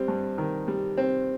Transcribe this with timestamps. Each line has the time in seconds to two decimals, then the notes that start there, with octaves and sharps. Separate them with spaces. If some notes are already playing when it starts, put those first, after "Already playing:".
Already playing: G3 C4
0.08 G2
0.38 D#3
0.68 G3
0.97 C4